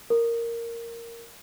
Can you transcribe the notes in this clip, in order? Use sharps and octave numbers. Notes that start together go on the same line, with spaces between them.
A#4